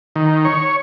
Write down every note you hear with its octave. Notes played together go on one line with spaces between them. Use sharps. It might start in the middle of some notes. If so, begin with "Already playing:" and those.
D#3
C#5